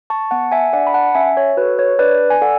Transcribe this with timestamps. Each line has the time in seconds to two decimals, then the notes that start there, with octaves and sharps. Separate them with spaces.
0.10 A5 C#6
0.31 B3 F#5 A5
0.52 E5 G#5
0.73 D4 A4 D5 F#5
0.87 B5
0.94 F#5 A5
1.15 C#4 E5 G#5
1.37 C#5
1.57 F#4 B4
1.61 A4
1.79 C#5
1.99 D4 B4 D5
2.30 G#5
2.42 A4 D5 F#5